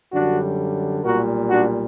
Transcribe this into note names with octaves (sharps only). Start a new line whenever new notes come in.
F#2 D3 G3 D4 F#4
B1 A#2 G3 F#4 A#4
D4 F#4